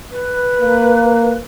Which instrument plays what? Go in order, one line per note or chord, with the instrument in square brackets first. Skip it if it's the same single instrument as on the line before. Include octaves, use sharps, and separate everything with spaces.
[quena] B4
[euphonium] A#3